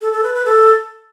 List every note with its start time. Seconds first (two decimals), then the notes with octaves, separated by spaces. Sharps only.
0.01 A4
0.12 A4
0.23 B4
0.34 B4
0.45 A4